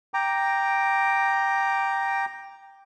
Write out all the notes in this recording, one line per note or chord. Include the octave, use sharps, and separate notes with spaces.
G5 A#5 D6